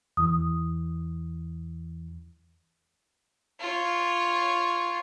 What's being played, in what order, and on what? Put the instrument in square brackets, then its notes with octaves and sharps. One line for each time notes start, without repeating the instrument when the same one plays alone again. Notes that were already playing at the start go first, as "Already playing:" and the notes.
[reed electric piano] E2 E3 [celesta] D#6
[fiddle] F4 C#5